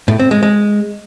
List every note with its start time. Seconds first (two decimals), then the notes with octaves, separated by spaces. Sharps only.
0.08 A2
0.19 C4
0.31 G#3
0.43 G#3